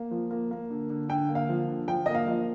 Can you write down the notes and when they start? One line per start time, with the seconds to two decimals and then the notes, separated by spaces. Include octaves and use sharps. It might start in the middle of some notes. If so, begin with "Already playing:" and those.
Already playing: A#3
0.11 F3
0.31 A#3
0.51 A#3
0.70 D3
0.90 D3
1.09 D3 G5
1.29 A#3
1.35 F5
1.49 F3
1.68 D3
1.88 F3 G5
2.06 A#3 D#5
2.15 F5
2.27 F3